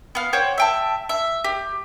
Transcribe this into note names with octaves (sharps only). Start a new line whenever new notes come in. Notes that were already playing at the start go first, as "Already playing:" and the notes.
B3 F5
C5 C#5 F#5 G5
E5 G5 A5
E5
G4